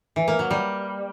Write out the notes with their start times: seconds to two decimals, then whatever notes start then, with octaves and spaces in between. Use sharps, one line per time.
0.16 E3
0.28 A#3
0.39 F#3
0.51 G3